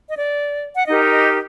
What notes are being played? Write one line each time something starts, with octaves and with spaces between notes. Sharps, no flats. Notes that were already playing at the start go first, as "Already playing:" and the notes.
D#5
D5
F#5
D#4 G4 A#4 D#5
D#5